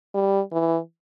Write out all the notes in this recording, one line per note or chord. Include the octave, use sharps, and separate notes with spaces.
G3
E3